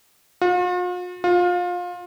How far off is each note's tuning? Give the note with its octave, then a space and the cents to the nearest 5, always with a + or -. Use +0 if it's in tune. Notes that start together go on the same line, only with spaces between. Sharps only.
F4 +45
F4 +25